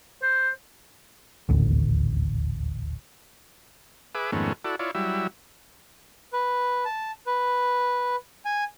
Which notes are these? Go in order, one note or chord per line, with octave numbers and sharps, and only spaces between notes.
C5
D#1 A1 D2
G#4 B4 E5 D6
F2 G#2 D#3 A3 B3 C#4
E4 F#4 A4 D5
E4 F4 C#5 D5
F#3 G3 E4 E5
B4
A5
B4
G#5